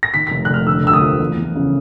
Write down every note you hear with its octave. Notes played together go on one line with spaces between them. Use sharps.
A#6
D#3 B6
B6
F1
F#6
F1 F6
D3 E6
D2 E6
D#6
F3
E2
E2
C#3